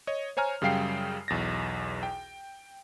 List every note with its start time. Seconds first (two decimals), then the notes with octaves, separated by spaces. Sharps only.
0.07 C#5 D#5
0.37 C5 C#5 G#5 A#5 F6
0.62 F#2 C#3 G3 F5 G5 C7
1.28 B1 E2 A6 A#6
2.03 G5